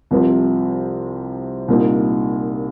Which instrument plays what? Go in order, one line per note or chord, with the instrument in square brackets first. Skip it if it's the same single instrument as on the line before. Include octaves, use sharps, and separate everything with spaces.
[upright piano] C2 C3 F3 C4
C2 A#2 A#3 D#4